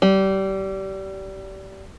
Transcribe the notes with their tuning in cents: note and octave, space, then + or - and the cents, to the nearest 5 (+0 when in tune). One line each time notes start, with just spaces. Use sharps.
G3 -25